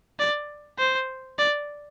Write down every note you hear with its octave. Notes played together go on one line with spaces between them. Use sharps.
D5
C5
D5